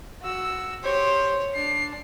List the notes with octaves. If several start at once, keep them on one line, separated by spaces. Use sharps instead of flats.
F#4 E6
G4 C5 C#5
D4 C7